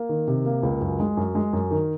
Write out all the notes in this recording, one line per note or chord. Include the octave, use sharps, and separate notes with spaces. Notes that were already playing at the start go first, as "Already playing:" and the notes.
Already playing: A#3
D#3
C3
A#3
C#2
F#2
G#3
F#2
G#3
F#2
D#3